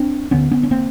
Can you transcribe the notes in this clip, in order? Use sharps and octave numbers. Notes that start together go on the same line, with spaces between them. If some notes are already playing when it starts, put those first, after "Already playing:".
Already playing: C4 D4
D2 D3 B3 C#4
B3 C#4
C#4
A#3 C4